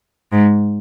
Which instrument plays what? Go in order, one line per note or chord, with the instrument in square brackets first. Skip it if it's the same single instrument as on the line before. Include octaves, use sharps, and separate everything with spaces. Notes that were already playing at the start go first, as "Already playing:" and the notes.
[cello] G#2